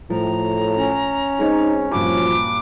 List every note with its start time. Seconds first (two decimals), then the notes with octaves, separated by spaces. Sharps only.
0.10 A2 F3 A#5
0.76 C#4
1.39 G#3 C4 D#4 C#5
1.92 G2 A#2 F3 F#3 D6